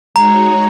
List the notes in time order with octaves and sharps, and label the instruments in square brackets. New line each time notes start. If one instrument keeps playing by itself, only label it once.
[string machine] G#3 D#4 F#4 C#5 [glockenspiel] A#5